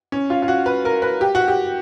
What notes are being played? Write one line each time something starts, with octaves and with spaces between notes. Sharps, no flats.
C#4
F4
F4
F#4
B4
A#4
B4
G4
F#4
G4